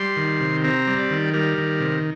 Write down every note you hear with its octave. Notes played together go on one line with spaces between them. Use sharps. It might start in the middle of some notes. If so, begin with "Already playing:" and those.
Already playing: G3 C6
D#3
C3
C4 A#5
G3
D5
D#3
G3 A#4
D#3
C3